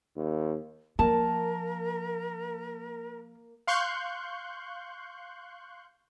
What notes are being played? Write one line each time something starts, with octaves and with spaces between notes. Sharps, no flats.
D#2
F3 A#3 A#4 A5
F5 C6 C#6 F#6 G6